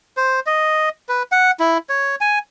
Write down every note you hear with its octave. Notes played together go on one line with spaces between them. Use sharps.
C5
D#5
B4
F#5
E4
C#5
G#5